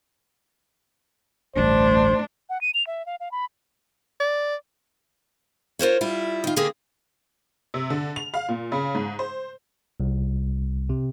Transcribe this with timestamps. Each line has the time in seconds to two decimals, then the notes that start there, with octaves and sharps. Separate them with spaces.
1.56 A1 D2 G2 A3 D4 C5
2.49 F#5
2.61 D#7
2.74 F7
2.87 E5
3.06 F5
3.20 F5
3.31 B5
4.20 D5
5.79 F4 A#4 C5 C#5
6.01 G3 E4 F4
6.44 D#3 F4
6.56 D3 A#3 G4 G#4 A#4
7.74 C3
7.90 D3
8.16 F7
8.34 F5
8.49 A#2
8.72 C#3
8.95 G#2
9.19 C5
10.00 C2
10.89 C3